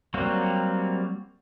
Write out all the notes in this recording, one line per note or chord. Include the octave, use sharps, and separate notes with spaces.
F#3 G3 A#3 C4 F#4